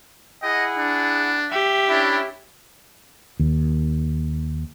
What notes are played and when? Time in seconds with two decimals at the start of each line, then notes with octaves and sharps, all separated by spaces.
0.43 E4 G#4 D#5 F#5
0.78 D4
1.50 G4 E5
1.89 C#4 D4 E4
3.40 D#2